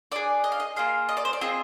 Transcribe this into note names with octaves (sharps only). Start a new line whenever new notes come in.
D4 G#4 D5
D#5
F5
D#5
A#3 F4 G#4 F5
D#5
D5
C5
D5
C4 F4 G#4 D#5